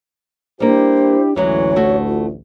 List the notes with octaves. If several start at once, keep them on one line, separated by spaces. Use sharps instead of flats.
G3 A#3 D4 E4 G4 C5
A1 D2 E3 F#3 G#3 C#5
A3 E4 F#4
F4